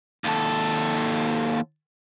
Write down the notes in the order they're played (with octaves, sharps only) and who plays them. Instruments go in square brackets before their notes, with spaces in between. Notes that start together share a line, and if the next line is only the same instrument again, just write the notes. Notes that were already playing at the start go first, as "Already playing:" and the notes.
[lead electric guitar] D#2 A4